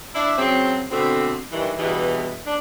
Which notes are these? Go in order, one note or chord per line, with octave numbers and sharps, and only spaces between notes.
D4 E4
C#3 F#3 C4
B2 D3 A3 C4
G2 D#3 E3
E2 G2 B2 E3
D4